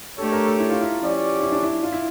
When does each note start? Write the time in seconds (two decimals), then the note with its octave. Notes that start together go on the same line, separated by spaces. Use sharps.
0.18 A3 D4 G4 A4 C#5
0.32 A#4
0.45 A4
0.59 E4
0.69 F4
0.81 E4
1.00 F3 C#4 G4 D5
1.41 E4
1.52 D4
1.63 E4
1.83 F4
1.92 E4